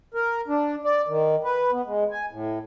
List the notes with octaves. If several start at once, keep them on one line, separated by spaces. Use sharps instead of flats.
A#4
D4
D5
D#3
B4
B3
G#3
G#5
A2